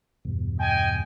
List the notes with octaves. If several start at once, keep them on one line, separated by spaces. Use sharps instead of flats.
E2 G2 B2
D#5 G5 G#5